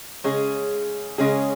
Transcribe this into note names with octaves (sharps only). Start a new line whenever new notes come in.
C#3 G#3 C#4 G#4
C#3 G#3 C#4 G#4